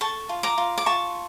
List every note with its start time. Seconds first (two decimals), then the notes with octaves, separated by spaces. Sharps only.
0.01 A4 A5 C#6
0.29 F4
0.43 A#5 D6
0.58 F4
0.78 D6
0.86 F4 A5 C#6